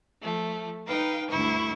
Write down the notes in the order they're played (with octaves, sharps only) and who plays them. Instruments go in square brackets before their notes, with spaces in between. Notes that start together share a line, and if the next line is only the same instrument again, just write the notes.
[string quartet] F3 A3
D#4 B4 F5 G5
D2 G2 E4 C#6